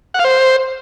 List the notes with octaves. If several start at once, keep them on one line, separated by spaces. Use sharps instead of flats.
F#5
F5
C5